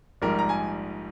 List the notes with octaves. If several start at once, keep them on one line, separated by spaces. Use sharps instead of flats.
A#1 G#2 G3 A#4
A#5
G#5